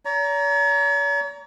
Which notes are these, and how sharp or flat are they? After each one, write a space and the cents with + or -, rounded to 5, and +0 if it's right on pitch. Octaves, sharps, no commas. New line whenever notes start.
C#5 +45 A#5 +0